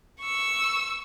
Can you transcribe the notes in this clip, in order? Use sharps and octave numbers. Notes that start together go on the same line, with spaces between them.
C#6 E6